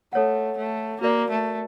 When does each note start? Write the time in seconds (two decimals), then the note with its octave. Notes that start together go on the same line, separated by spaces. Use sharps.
0.13 A3 A4 C#5 F#5
0.57 A3
1.01 A#3 F#4 A#4 D5
1.30 A3